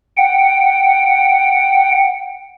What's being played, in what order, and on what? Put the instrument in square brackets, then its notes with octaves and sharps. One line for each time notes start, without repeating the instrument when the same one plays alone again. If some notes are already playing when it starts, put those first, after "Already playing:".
[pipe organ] F#5 G5